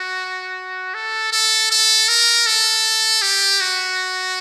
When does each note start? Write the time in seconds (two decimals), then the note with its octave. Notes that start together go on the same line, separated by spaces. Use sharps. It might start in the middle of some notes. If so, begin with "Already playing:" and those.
Already playing: F#4
0.94 A4
1.32 A4
1.71 A4
2.09 A#4
2.47 A4
3.22 G4
3.61 F#4